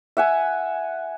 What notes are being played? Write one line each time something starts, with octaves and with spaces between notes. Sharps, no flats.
E5 F#5 G#5